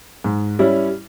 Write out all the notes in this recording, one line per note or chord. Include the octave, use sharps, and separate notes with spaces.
G#2
G3 C#4 E4